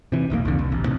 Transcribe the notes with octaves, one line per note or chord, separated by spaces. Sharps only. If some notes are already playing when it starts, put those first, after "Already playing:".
C3 E3
F1 B1 A#2 A#3
C2 F2 D3
C2
A1
A2 C3